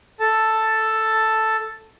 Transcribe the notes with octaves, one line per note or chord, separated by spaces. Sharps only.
A4 A5